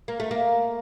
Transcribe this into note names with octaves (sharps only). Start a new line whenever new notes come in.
A#3
A3
A#3